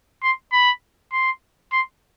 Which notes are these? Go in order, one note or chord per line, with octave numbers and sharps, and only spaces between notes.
C6
B5
C6
C6